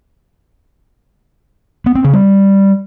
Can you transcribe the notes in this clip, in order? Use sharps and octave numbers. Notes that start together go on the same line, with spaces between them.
B3
C4
C#3
G3